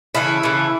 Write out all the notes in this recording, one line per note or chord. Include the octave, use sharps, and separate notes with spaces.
C#3 E3 A3 E4
C#3 E3 A3